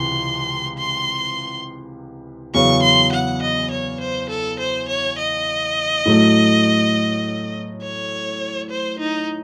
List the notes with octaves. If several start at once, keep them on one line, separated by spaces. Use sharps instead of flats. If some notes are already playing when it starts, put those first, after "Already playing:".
Already playing: C#2 C3 E3 C6
C6
E2 C#3 F#3 C#4 C#6
C6
F#5
D#5
C#5
C5
A4
C5
C#5
D#5
A2 F#3 A3
C#5
C5
D#4